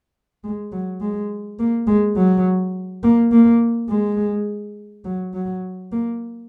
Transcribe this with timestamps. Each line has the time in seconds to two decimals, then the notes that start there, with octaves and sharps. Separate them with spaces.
0.44 G#3
0.72 F#3
1.01 G#3
1.59 A#3
1.87 G#3
2.16 F#3
3.03 A#3
3.32 A#3
3.89 G#3
5.05 F#3
5.34 F#3
5.92 A#3